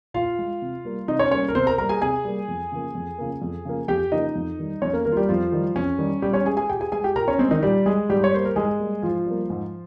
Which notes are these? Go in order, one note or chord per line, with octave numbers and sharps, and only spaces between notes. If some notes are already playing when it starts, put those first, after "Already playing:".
A#2 F4 F5
G#3
C3
G3 A#3
C3 D#4 D#5
C#4 C#5
G3 A#3 C#4 C#5
A#4
C3 C4 C5
A#4 A#5
G3 A#3 A#4 A#5
G#4 G#5
C3 G#4 G#5
G3 A#3
F2
C#3 F3 A#3
F2
C#3 F3 A#3
F2
C#3 F3 A#3
F2 G4 G5
C#3 F3 A#3 D#4 D#5
F2
D#3 G3
F2 C#4 C#5
A#3 A#4
D#3 G3 A#3 A#4
F4
G3 G4
F2 F3 F4
D#3 G3
F2 C#4
D#3 G3
A#2 G3 G4
C#4 C#5
G#3 G#4 G#5
G#4 G#5
A#2 G4 G5
G#4 G#5
G#3 G#4 G#5
G4 G5
A#2 A#4 A#5
C#4 C#5
G#3 C4 C5
D#3 D#4
A#2 G3 G4
G#3 G#4
G#2 G3 G4
C#5
G3 A#3 C5
A#4
G#2 G#3 G#4
G3 A#3
G#2 F3 F4
G3 A#3
G#2